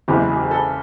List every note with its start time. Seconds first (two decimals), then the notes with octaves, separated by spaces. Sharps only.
0.08 F#1 E2 C#3 E3 G#3 G4
0.29 G#4
0.37 G4
0.44 G#4
0.51 A4